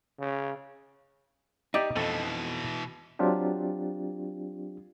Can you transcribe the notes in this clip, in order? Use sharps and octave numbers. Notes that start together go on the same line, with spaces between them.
C#3
D#4 G4 D5 E5
F2 B2 E3 A3 A4
F#3 C4 D4 F4 G4